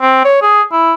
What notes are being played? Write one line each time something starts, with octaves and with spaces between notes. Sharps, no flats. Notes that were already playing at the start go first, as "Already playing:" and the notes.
C4
C#5
G#4
E4